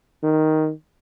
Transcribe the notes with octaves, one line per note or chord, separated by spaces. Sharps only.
D#3